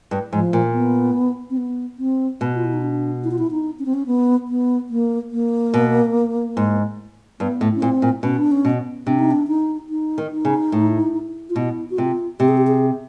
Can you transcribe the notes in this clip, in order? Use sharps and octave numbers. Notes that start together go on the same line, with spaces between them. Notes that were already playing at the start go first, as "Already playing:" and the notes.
G2
G#2 F3
A#2
B3
C4
B3
C4
B2
F4
E4
D#4
D4
E4
F4
E4
D#4
C#4
C4
C#4
B3
B3
A#3
A#3
B2
G#2
G2 B3
A2
C#4
A#2 C4
A#2
B2 C#4
D4
C#4
B2
C3 D4
D#4
D4
D#4
D#4
D#3
D#4
C#3
A2
F4
B2 E4
F#4
C3 F4
C3 G4
G#4
G4
G#4